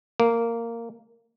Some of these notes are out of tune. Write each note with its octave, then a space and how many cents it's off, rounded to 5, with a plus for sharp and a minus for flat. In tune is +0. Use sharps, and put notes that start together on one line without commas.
A#3 -10